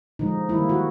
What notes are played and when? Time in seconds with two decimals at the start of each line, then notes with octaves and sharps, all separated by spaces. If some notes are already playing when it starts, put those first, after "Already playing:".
0.19 D3 F3 G#3 D#4
0.49 D#3 G3 A#3 E4
0.69 F#4